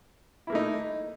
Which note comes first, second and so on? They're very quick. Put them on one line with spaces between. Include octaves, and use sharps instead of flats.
E4 A#3 A3 D#4